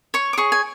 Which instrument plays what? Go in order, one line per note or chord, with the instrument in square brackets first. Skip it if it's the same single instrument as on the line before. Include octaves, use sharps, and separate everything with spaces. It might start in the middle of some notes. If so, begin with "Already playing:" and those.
[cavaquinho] C#5 C#6
D6
G#4 C#6
G#5